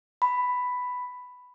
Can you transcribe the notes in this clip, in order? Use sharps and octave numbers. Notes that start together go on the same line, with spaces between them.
B5